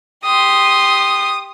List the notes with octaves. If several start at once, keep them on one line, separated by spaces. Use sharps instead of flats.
G4 C6 D#6